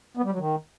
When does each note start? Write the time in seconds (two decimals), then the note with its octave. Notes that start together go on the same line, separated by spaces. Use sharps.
0.17 B3
0.24 G3
0.32 F#3
0.39 D#3